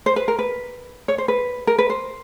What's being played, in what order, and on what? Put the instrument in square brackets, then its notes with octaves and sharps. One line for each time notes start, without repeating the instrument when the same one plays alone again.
[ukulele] C5
B4
A#4
B4
C#5
C5
B4
A#4
B4
C5